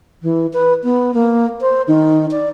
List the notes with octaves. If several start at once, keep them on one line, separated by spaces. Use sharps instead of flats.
E3
B4
B3
A#3
C5
D#3
D5